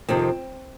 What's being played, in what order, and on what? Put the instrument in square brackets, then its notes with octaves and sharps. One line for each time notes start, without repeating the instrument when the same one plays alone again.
[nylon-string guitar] F2 C3 D#3 C4